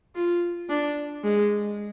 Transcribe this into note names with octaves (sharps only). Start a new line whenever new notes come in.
F4
D4
G#3